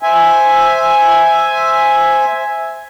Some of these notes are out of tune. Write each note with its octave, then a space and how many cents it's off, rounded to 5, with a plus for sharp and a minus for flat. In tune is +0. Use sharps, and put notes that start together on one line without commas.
C5 +0 E5 +0 G#5 +0